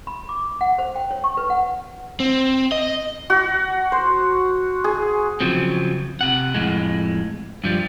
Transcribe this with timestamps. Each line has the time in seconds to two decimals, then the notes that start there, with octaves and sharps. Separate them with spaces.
0.07 B5
0.29 D6
0.61 F#5
0.78 C5
0.95 G5
1.11 C#5
1.24 C#6
1.37 B4
1.50 F#5
2.20 C4
2.72 D#5
3.30 F#4
3.92 C5
4.84 G#4
5.40 C#3 F3 F#3 C4
6.21 C3 F#5
6.54 F2 A2 G#3
7.64 G2 F3 G3